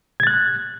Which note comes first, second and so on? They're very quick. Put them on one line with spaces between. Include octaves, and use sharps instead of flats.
G#6 A6 F#6